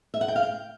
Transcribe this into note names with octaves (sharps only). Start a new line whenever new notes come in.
E5
F#5
G5
F5
G5